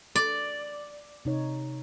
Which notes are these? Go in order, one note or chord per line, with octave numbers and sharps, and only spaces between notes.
D5
C3 D#4 C#5